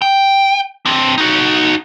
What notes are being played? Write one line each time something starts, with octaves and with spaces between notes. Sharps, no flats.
G5
C4 D4
D#4 F#4